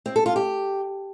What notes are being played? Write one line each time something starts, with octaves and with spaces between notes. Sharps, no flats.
C4
A4
F4
G4